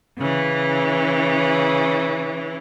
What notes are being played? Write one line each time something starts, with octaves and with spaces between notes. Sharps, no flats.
C#3 E3